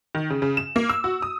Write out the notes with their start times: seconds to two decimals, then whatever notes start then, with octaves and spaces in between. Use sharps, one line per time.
0.15 D#3
0.30 C#3
0.42 C#3
0.57 E7
0.76 A#3
0.90 E6
1.04 F#4
1.22 D#6